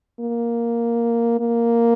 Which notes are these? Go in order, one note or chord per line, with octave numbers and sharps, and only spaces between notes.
A#3
A#3